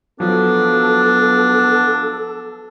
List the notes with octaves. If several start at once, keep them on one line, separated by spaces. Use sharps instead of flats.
F3 F#3 B3 D4 A4